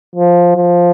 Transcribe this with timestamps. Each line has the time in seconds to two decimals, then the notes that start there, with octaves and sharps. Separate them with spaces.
0.16 F3
0.56 F3